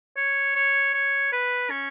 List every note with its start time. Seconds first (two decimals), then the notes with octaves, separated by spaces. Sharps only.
0.17 C#5
0.55 C#5
0.94 C#5
1.33 B4
1.70 C#4